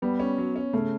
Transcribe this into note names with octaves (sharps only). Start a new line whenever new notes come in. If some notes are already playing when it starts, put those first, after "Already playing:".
G3 B3
C#4
F#3
C#4
C#3 A3